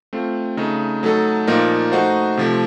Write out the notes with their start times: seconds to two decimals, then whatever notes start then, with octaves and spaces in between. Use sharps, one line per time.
0.13 A3 C4 F4
0.57 C#3 A3 D#4
1.03 F#3 A3 D#4 A4
1.47 A#2 F3 A#3 D#4 A#4
1.92 A3 D#4 F#4 C5
2.37 C3 F3 A3